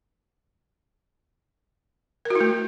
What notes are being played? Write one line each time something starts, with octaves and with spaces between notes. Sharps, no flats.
A#4
F#4
E4
A3